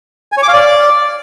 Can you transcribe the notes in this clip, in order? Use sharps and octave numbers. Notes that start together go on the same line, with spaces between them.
G#5
C#5
D6
F5
D5